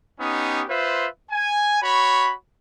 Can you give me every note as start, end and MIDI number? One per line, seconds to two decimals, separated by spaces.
0.20 0.64 59
0.20 0.64 61
0.20 0.64 63
0.20 0.64 67
0.69 1.08 65
0.69 1.08 71
0.69 1.08 72
0.69 1.08 76
1.30 1.82 80
1.82 2.34 66
1.82 2.34 73
1.82 2.34 83